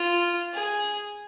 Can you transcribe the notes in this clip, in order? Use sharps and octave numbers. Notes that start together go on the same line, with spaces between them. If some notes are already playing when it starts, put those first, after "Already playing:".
Already playing: F4
G#4